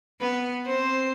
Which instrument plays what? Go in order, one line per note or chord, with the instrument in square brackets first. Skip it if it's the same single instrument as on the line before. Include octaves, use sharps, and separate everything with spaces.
[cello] B3 [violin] B4
[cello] C4 [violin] C5